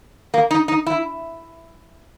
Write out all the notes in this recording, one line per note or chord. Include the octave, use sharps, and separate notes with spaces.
A#3
D#4
D#4
E4